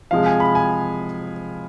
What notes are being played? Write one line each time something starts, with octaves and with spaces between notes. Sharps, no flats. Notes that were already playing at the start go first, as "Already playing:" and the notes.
C3 F3 G#3 F5
G#5
B5
G#5